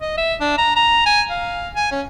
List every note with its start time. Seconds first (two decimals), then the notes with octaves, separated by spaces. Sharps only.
0.01 D#5
0.18 E5
0.40 D4
0.58 A#5
0.76 A#5
1.06 G#5
1.30 F5
1.76 G#5
1.91 C#4